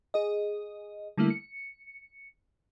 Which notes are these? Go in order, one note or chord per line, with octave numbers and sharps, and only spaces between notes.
G#4 D#5
D3 G3 A3 A#3 E4
C#7